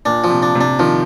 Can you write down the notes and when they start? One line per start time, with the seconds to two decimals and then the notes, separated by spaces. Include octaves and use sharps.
0.06 A#2 D4
0.24 F3
0.30 C3
0.42 D4
0.55 C3
0.61 D4
0.79 D#3 F3